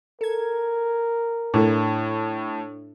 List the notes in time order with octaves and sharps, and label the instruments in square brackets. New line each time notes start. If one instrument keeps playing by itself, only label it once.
[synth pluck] A4 G#6 [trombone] A#4
[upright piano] A2 [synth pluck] D4 E4 A4